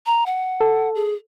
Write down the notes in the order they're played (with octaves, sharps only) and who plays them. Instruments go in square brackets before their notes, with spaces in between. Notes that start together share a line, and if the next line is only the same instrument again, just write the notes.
[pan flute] A#5
F#5
[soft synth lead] A4
[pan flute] G#4